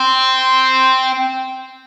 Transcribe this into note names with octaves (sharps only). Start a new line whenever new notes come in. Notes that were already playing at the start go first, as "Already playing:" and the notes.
Already playing: C4